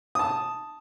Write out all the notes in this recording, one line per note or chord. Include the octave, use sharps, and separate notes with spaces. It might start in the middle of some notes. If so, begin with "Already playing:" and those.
A5 D#6